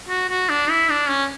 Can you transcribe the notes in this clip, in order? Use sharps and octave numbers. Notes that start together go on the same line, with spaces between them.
F#4
F#4
D4
E4
D4
C#4